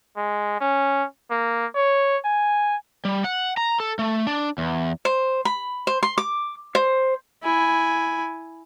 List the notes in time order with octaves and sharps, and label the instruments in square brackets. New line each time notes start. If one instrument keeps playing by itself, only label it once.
[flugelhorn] G#3
C#4
A#3
C#5
G#5
[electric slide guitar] G3
F#5
A#5
A4
A3
D4
E2
[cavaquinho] C5
B5
C5
C6
D6
C5
[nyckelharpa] E4 G#5